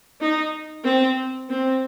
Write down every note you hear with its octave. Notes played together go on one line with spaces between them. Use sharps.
D#4
C4
C4